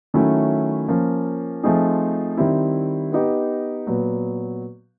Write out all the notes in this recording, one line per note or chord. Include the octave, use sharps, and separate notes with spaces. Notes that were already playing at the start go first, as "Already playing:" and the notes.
D#3 F#3 A3 C#4 E4
F3 A#3 C#4
F3 A3 C4 D#4 G#4
D#3 G3 C4 E4
B3 D#4 G4
A#2 F#3 B3